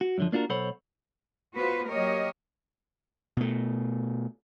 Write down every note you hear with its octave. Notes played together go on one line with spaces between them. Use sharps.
F#4
F#2 D3 F3
A#3 D4 F4 F#4 A#4
B1 A4 C5 C#5 F#5 B5
B3 F4 F#4 B4 C5
F#3 A#3 G4 A#4 C#5 D#5
B2 A3